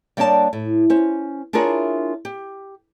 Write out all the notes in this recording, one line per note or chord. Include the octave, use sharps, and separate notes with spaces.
G3 A#3 D4 C#5 D#5 A5
A2
C#4 C5
D4 E4 F4 G#4 A#4 C#5
G4